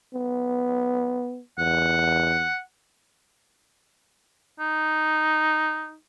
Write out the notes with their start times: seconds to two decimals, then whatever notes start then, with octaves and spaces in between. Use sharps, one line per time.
0.14 B3
1.58 E2 F#5
4.60 D#4